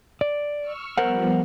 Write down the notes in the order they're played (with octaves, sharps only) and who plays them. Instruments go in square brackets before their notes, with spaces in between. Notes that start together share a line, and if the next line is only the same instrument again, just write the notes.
[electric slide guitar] D5
[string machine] C#6 E6 F6
[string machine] F3 G3 B3 [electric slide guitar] A#4 C5 F#5